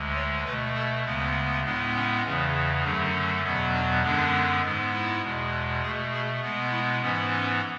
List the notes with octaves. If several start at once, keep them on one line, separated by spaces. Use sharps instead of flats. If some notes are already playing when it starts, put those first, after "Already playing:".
Already playing: D2 D3 G#3
C#5
B2 A3 B4
A4
D2 C#3 G#3 B3
A2 G#3 B3 D4
C#4
E2 C#3 E3 C#4
F#2 D3 F#3 A3 D4
C#4
E2 B2 F#3 B3
D4
F#2 D3 G#3 B3 D4
G#2 G#3 B3
E4
E2 B2 G#3
B2 A3 G#4
G#4
B2 G#3 B3
E4
G#2 E3 B3 C#4
C#4